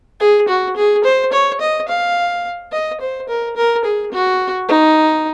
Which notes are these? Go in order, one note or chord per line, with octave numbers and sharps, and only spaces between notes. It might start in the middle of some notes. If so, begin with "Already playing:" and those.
G#4
F#4
G#4
C5
C#5
D#5
F5
D#5
C5
A#4
A#4
G#4
F#4
D#4